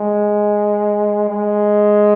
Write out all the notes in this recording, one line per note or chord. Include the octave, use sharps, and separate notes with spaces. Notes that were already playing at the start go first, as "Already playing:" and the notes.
Already playing: G#3
G#3